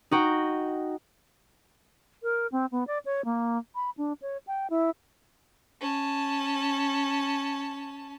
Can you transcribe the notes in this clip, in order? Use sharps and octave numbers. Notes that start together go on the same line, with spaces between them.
D#4 F#4 G5
A#4
C4
B3
D5
C#5
A#3
B5
D4
C#5
G5
E4
C#4 A5